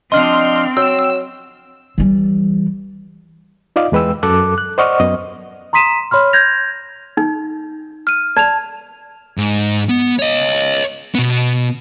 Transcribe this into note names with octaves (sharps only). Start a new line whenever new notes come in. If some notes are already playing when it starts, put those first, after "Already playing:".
F3 C4 D4 D#5 C6 F6
F#3 G5 E6
E3 G3
D#4 F4 D5 D#5 F5
E2 G#3 B4 G5 E6
F#2 A4 D6 F#6
F#6
C5 D5 D#5 F#5 C#6 F6
F#2 B3 D#5
A#5 C6 D#6 B6 D#7 E7
C#5 B5 C6 F6
G6 G#6 A#6 F7
D#4
F6 D#7
D5 A5 F7
G#2
B3
C#5 D#5
B2 B3